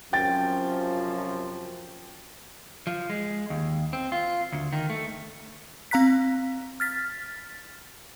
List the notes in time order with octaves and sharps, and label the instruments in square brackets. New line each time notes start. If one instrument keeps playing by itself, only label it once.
[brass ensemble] F#2 C3 F3 [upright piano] G5 A6
[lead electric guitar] F3
G#3
D#2
C4
F4
D2
D#3
A3
[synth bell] C4 F5 A#5 F#6 B6
F6 A6 B6